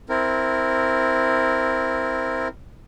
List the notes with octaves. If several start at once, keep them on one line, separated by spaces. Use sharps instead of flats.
C4 E4 A#4